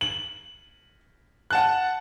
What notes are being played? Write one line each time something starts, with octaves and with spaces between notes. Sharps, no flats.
F#7
F#5 A5 F#6